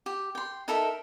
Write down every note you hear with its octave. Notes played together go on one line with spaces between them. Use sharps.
G4
G5 C6
D#4 A4 A#4 E5